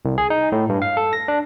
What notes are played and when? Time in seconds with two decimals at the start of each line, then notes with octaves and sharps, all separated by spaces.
0.05 C2
0.18 G#4
0.30 D#4
0.52 A2
0.69 G2
0.82 F5
0.97 A4
1.13 A#6
1.28 D4